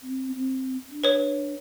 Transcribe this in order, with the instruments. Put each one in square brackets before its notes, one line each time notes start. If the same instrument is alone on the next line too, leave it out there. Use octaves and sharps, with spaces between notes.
[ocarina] C4
C4
D4
[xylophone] B4 C#5